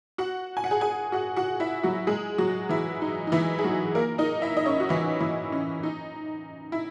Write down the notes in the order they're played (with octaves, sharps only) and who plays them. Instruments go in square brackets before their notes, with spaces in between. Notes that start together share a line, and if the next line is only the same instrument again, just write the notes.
[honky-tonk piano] F#4 F#5
G#5
F#5
G#4 G#5
G#4 G#5
F#4 F#5
F#4 F#5
E4 E5
F#3 F#4
G#3 G#4
F#3 F#4
E3 E4
D#4
D#4
E3 E4
G#4
F#3 F#4
A#3 A#4
D#4 D#5
E4 E5
D#5
C#4 C#5
F#4
E3 E4
E3 E4
C#4
D#4
E4